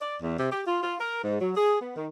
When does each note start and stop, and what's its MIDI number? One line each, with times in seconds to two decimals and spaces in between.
0.01 0.16 74
0.22 0.33 40
0.38 0.50 48
0.51 0.61 67
0.66 0.79 65
0.83 0.95 65
1.00 1.21 70
1.22 1.36 44
1.40 1.51 54
1.56 1.76 68
1.80 1.95 59
1.96 2.07 51